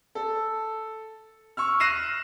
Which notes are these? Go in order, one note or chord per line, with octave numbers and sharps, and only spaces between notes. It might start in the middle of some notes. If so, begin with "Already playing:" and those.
A4
C#6 E6 F6
F6 F#6 A#6 C7 D#7 E7